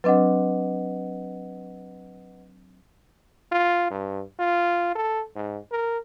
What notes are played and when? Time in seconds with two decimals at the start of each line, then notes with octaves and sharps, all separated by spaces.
0.04 F#3 C4 D4 B4 D#5 F#5
3.52 F4
3.91 G2
4.39 F4
4.95 A4
5.35 G#2
5.71 A#4